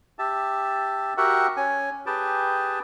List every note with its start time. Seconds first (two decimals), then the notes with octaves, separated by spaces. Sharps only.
0.19 G4 E5 A5
1.17 F#4 G4 A#4 E5 F#5
1.57 C#4 G#5
2.06 G4 G#4 B4 G5 A5